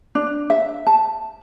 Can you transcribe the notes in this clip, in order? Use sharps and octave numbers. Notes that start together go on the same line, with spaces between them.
D4
E5
A5